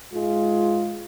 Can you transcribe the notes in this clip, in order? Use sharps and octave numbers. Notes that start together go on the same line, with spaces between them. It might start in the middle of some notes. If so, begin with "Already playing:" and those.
G#2 G#3 F4